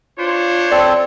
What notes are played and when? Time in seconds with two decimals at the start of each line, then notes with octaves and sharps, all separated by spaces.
0.19 D4 F4 C5 C#5
0.71 C4 A4 D5